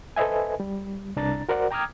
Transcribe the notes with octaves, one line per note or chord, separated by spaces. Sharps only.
A4 B4 C5 D#5 E5 G#5
G3
C2 D4 A#5 A6
F#4 A#4 C5 D5 F#5
G5 A#5 D6 D#6 F6 G#6